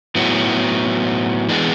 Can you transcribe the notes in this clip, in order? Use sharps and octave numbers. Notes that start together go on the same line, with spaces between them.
A2 F#3 B3 E4
E3 G#3 B3 D4